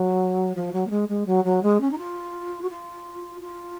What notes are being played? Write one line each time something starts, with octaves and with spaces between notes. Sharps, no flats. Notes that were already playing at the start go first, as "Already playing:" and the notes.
Already playing: F#3
F3
F#3
A#3
G#3
G#3
F#3
F#3
G#3
C#4
D#4
F4
F#4
F4
F4